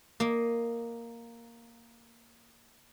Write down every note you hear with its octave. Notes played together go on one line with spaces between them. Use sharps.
A#3 D#5